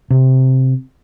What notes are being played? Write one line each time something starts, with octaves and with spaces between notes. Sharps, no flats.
C3